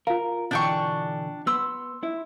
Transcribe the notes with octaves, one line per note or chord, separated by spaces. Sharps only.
F4 A#4 F5
B2 D3 E3 D4 G5 C#6
B3 C6 E6
E4